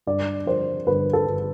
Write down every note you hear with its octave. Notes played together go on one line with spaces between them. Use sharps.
G2 D5
F3 C5
G1 B4
A4
G1